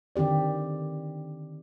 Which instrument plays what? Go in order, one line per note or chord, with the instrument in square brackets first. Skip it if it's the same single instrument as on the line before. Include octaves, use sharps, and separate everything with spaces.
[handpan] D3 D#3 C4 G4 D5